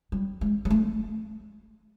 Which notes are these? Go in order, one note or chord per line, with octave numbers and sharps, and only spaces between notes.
G3
G#3
G#3
A3